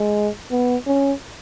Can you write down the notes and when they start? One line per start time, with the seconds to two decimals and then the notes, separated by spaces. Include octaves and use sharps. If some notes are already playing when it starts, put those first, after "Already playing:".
Already playing: G#3
0.51 B3
0.87 C#4